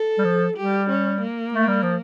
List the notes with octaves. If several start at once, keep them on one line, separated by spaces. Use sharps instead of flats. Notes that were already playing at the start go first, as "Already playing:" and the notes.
Already playing: A4
G3
F3
G3 G4
C#4
A#3
A3
G3
F3